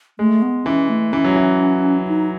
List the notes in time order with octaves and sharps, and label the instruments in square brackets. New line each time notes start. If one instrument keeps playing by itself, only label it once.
[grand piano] G#3 [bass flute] A3
[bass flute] B3
[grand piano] E3 [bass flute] C#4
[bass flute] A3
[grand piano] E3 [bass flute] C#4
[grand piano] F#3
E3
[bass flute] D#4